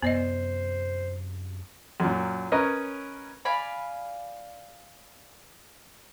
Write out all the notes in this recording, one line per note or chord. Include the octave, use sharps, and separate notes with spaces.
F#2 C3 B3 C5 D5 D#5
F#2 A#2
C#4 A#4 B4 C#5 D#5
D5 F5 G#5 B5